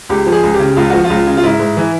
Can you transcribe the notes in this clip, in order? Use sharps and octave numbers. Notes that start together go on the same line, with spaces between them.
C#2 G4
F3
G#4
C#2
G4
C#3
C#2 F4
F3 F#4
F4
C#2
C#3
F4
G#2 E4
G#2
E3